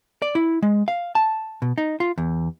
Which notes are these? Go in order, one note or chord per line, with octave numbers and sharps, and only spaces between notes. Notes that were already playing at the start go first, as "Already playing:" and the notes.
D5
E4
G#3
F5
A5
B2
D#4
F4
E2